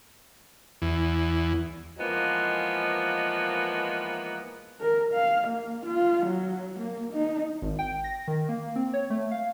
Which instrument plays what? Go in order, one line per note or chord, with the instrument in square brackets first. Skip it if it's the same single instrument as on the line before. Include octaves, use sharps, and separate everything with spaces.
[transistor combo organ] E2
[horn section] E3 F3 G#3 A#3 B3 D#4
[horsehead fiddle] A#4
F5
A#3
F4
F#3
A#3
D#4
[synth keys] G#1
G5
A#6
D#3
A#3
C4
C#5
A3
F5